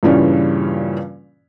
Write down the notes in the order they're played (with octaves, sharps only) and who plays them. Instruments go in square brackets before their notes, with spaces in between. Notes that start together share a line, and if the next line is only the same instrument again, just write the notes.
[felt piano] G2 A#2 C#3 E3 G3 C#4